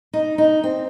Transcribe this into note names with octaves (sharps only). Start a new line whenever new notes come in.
D#4
D#4
C4